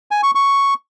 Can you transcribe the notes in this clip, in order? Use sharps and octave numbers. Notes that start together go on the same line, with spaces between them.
G#5
C#6
C#6